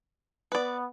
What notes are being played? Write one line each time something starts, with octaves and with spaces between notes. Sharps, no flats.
B3 B4 D5